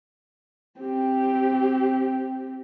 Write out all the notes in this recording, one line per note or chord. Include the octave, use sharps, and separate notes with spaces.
C4 G4